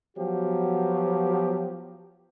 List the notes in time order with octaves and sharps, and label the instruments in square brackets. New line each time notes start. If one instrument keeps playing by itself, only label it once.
[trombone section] F3 F#3 B3 F#4 G4